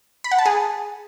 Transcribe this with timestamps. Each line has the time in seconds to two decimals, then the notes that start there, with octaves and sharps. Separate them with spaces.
0.24 B5
0.31 F#5
0.39 A5
0.46 G#4